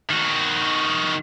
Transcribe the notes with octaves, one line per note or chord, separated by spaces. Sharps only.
D#3 F#4